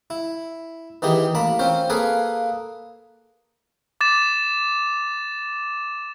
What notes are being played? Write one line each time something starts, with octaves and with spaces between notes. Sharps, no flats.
E4
D#3 E3 B3 G4 G#4
A1 A#3 A5 B5
C4 C#4 F4 C5
A#3 G#4 A4 B4 F5 G#5
D6 A6 E7